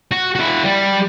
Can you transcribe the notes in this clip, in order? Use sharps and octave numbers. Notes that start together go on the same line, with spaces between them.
F#4
E4 F#4
G3